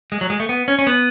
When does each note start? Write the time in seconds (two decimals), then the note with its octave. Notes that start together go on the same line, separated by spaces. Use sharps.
0.12 G#3
0.21 F#3
0.30 G#3
0.40 A3
0.49 B3
0.68 C#4
0.79 C#4
0.87 B3